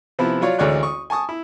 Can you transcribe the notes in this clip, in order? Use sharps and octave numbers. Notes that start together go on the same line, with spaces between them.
C3 F3 B3 E4
F#3 F4 C#5 D5
A1 D2 G#3 C#5 D5 F#6
C#6 D#6
G#5 A5 C#6 D#6
E4